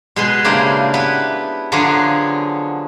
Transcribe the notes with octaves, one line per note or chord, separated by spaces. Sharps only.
B2 G#3 G#4 B4 C6
C#3 A#3 D4 E4 G4 C5
B3 E4 B4
D3 F3 F#3 B3 D4 G#4